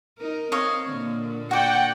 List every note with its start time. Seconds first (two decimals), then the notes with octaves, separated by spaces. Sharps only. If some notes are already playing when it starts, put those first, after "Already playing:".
0.18 D#4 A#4
0.52 C4 C#5 D#5 F5
0.90 A#2 D3 A#3
1.51 F#4 D5 F#5 G5